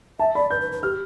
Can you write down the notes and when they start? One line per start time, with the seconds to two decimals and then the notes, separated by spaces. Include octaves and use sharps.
0.19 E5 A5
0.35 D5 B5
0.50 B4 G6
0.61 B4
0.72 B4
0.83 G4 F6